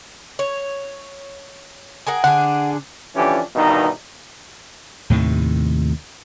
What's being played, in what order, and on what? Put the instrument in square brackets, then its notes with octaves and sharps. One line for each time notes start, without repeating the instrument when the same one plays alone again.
[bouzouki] C#5
G#4 A#4 F#5
[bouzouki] D3 D4 G#4 [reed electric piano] F#5
[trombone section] D3 E3 F3 C#4 D4 G4
E2 G2 B2 D#3 D#4
[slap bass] D#2 A2 C3 D#3